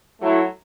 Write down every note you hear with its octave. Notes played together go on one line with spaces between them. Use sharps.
F#3 A3 E4